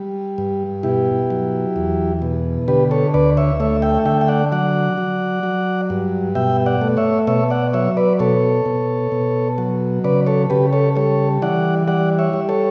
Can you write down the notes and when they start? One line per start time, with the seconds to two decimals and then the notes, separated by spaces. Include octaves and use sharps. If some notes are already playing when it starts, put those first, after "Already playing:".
Already playing: G3
0.38 G2
0.83 B2 E4 G4
1.30 F#3
1.76 E2
2.22 B2
2.68 D3 G4 B4
2.91 A4 C#5
3.14 D2 B4 D5
3.37 C#5 E5
3.60 A3 C#5 E5
3.82 E5 G5
4.05 D3 E5 G5
4.21 G5
4.28 D5 F#5
4.52 F#3 D5 F#5
4.98 F#3
5.43 F#3
5.90 G2
6.35 B2 E5 G5
6.66 D5 F#5
6.81 A3
6.97 C#5 E5
7.27 B2 C#5 E5
7.50 D5 F#5
7.73 F#3 C#5 E5
7.97 B4 D5
8.19 B2 A4 C#5
8.66 B2
9.12 B2
9.58 F#3
10.04 C#3 B4 D5
10.26 A4 C#5
10.50 C#3 G4 B4
10.73 A4 C#5
10.96 G3 A4 C#5
11.42 E3 D5 F#5
11.87 G3 D5 F#5
12.19 C#5 E5
12.33 G3
12.49 A4 C#5